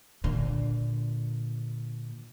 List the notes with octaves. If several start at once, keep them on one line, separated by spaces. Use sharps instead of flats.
A#2 D3